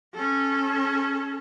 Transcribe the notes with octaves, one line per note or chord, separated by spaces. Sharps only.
C#4 A4